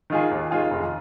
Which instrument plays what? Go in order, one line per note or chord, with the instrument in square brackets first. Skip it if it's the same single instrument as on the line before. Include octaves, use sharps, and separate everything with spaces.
[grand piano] D#3 G#3 F4 G#4
D#2
D#3 G#3 F4 G#4
F1